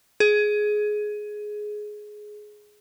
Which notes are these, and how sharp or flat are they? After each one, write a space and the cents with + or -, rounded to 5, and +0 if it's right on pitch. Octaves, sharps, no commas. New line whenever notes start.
G#4 +15